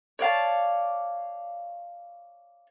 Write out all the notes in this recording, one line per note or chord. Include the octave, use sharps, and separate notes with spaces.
C#5 D5 F5 A5